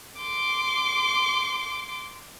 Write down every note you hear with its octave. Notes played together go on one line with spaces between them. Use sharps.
C6 D6